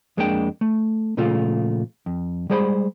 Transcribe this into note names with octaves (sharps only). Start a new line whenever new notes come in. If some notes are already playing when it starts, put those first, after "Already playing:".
F2 G#3 A#3 D4 G#4 G5
A3
A#2 C#3 F3 A3 F4
F2
G3 G#3 G#4 C5 F#5 B5